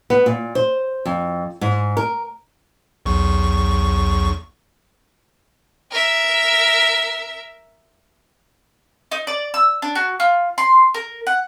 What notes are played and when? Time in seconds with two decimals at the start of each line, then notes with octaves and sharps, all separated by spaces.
0.10 B3
0.26 A#2
0.55 C5
1.05 F2
1.61 G#2
1.97 A#4
3.06 B1 E2 C#6
5.91 A#4 E5
9.11 D#4
9.27 D5
9.54 E6
9.82 D4
9.95 F#4
10.20 F4
10.58 C6
10.94 A#4
11.27 F#5